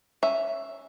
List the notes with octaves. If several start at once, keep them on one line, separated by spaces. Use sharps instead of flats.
C#4 E5